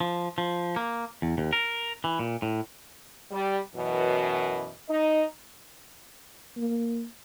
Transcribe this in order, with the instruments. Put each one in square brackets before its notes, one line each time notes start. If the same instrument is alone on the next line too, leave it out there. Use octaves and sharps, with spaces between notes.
[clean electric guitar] F3
F3
A#3
E2
D#2
A#4
E3
A#2
A2
[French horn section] G3
F#2 B2 E3
D#4 D#5
[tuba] A#3